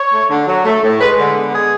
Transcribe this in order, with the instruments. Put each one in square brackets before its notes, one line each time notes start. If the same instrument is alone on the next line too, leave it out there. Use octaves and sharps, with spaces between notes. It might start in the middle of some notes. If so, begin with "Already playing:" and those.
Already playing: [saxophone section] C#5
A3
D3
F#3
A3
A2
G#3 B4
D3
B3
G#3 G#4